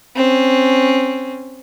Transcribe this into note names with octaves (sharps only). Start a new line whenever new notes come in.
C4 C#4